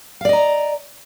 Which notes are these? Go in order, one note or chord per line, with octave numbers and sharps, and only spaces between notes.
D5 D#5 F5 A#5